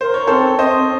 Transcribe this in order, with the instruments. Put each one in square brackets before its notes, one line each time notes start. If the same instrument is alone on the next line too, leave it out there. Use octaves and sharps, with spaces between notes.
[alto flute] A#4 [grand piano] C5
[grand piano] C#5
[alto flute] C4 [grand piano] A4 C5
[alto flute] C4 [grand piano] C5 D#5